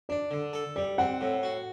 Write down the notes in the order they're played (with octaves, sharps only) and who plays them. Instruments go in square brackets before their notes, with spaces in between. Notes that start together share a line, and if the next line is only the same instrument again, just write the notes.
[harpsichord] D4 [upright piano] D5
[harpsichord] D3
A4
[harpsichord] G3 [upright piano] D5
[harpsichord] C4 [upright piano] F#5
[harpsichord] A2
F#4